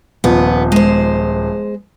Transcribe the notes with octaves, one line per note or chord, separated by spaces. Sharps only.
D#1 F3 B3
G#3 C5